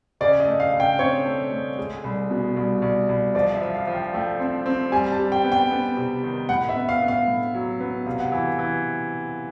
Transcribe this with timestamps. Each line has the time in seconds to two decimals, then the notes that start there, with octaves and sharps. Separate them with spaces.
0.21 C#3 D5
0.40 D#5
0.47 A3
0.60 F5
0.73 C#3
0.80 G5
0.99 C4 C#5
1.25 A3
1.52 A3
1.78 G#3
2.04 C2
2.30 B2
2.56 C2
2.82 C2
3.09 C2
3.35 F3 D5
3.54 E5
3.61 F3
3.75 F5
3.87 F3
3.94 G5
4.14 A3 G5
4.39 C4
4.66 C4
4.92 G3 G#5
5.12 A5
5.19 G3
5.32 G5
5.44 B3
5.52 G5
5.71 B3
5.97 C3
6.23 D#3
6.49 A2 F#5
6.69 E5
6.76 B3
6.89 F5
7.02 B3
7.08 F5
7.28 A2
7.54 F#3
7.80 B3
8.06 C3 F5
8.19 F#5
8.32 E3 F5
8.59 E3